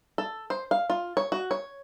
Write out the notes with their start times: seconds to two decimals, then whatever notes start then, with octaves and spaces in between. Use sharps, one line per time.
0.18 A4
0.50 C5
0.71 F5
0.90 F4
1.17 C#5
1.32 F#4
1.51 C#5